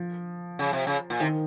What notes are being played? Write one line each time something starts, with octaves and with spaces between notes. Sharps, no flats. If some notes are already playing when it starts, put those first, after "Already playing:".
Already playing: F3
C#3
C3
C#3
A#2
C3 D#3